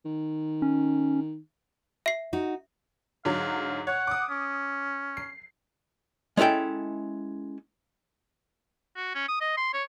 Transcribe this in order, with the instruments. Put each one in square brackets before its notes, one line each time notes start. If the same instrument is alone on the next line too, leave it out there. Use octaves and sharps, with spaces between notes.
[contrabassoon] D#3
[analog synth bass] C#4
[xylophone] E5 C7
[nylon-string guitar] D#4 F#4
[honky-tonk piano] G#2 D3 F#3 [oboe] F5
[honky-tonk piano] C#5 [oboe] F#5
[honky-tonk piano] D6 D#6
[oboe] C#4
[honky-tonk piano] C7
[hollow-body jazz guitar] G#3 C#4 E4 A4 G5
[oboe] F#4
C#4
D#6
D#5
C6
C#5